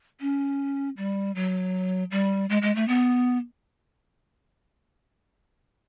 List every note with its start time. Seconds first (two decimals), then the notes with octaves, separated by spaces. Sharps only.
0.20 C#4
0.97 G3
1.35 F#3
2.11 G3
2.49 G#3
2.62 G#3
2.75 A3
2.88 B3